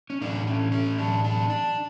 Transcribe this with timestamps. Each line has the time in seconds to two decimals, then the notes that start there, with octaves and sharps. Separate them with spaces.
0.10 C#4
0.21 A2 E3 D4
0.47 C#4
0.72 C#4
0.98 D4
1.24 D4
1.50 D4